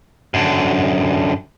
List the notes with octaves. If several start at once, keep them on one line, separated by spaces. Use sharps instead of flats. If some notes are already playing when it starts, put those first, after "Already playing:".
F#2 D3